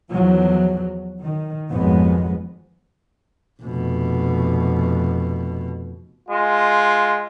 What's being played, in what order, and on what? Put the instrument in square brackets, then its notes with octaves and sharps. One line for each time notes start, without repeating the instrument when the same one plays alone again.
[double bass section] E2 F3 F#3
D#3
G#1 F2 F#3 G#3 B3
[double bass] F1 B2
[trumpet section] G#3 F4